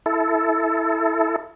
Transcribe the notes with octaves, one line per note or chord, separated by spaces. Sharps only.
E4 A4